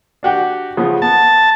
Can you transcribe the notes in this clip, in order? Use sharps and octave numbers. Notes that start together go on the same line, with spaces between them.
D4 F#4 G4
C#3 F3 B3
B3 A5